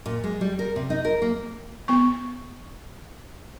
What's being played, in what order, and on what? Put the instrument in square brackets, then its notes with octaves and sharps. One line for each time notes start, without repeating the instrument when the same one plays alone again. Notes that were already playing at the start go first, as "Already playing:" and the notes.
[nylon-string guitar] A#2
G#3
G3
A#4
C3
D#4
A#4
A#3
[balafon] B3 C#6